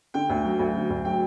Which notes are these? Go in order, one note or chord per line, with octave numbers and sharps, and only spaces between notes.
D3 G5
D2
F#3
D2
D3
D2
F#3 G5